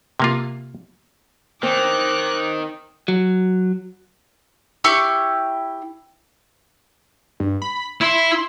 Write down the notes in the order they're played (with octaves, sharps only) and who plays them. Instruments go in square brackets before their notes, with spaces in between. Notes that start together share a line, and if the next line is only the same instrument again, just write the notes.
[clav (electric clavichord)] C3 A#3 F4
[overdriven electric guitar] D#3 [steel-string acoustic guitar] C4 [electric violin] D6 F#6
[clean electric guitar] F#3
[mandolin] E4 G4 C#6
[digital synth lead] G2
B5
[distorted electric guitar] E4 [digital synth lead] C6